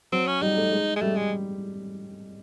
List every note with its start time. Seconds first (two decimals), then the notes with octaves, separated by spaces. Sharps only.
0.12 F#3 C4
0.27 C#4
0.42 G3 D#4
0.57 A3
0.72 G#3
0.96 G#3
1.01 G3 A3
1.16 G#3